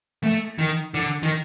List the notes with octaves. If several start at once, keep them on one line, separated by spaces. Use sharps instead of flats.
A3
D#3
D3
D#3